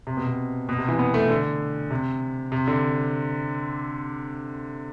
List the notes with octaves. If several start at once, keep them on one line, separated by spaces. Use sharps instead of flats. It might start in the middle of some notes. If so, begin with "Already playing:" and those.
C3
B2
C3
B2
C3
E3
B3
A3
D3
C3
C3
D3